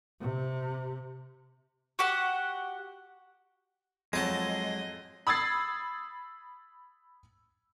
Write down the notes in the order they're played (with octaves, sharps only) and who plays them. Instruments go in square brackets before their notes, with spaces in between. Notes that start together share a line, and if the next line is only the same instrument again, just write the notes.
[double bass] C3
[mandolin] F#4 G4 F#5
[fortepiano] F2 [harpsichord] F#3 A5 D#6 [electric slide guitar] G#3 [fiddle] D#5
[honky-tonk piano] B5 D#6 E6 G#6 A6 C7